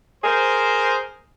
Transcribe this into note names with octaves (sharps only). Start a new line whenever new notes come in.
G#4 A#4 C5